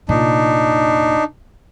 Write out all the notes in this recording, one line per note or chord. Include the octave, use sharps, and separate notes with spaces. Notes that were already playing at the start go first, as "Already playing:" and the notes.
F1 A#2 D4 D#4